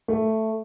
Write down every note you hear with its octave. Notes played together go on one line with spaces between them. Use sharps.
A3